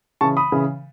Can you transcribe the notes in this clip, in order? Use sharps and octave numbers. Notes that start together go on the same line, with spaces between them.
C#3 E3 A5 C#6
B5 D#6
C#3 E3